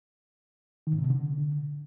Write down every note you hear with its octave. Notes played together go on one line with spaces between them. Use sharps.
D#3
G#2
C3
B2
D3